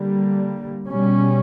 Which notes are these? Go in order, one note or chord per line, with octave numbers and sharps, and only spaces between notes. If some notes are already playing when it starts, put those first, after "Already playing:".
Already playing: D3 G3 A#3
B2 G3 C#4